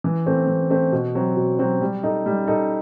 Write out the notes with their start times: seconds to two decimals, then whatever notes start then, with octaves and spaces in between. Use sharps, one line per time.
0.04 E3
0.26 A3 C4
0.48 E3
0.70 A3 C4
0.92 B2
1.15 F#3 C4
1.37 B2
1.59 F#3 C4
1.81 G3
2.03 D#4 A4
2.26 G3
2.48 D#4 A4